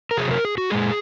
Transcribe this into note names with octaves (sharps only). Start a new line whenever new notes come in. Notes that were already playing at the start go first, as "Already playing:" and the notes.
A#4
C3 F#3 G#4
A#4
G#4
F#4
A#2 G#3 G#4